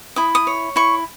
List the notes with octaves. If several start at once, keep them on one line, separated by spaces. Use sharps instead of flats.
E4 D#6
D#6
C#5
E4 C#6